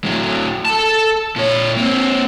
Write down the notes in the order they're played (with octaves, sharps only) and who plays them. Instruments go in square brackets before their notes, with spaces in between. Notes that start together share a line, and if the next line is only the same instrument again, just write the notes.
[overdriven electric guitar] A2 F#3
A4 A5
A#2 C#5
A#3 C4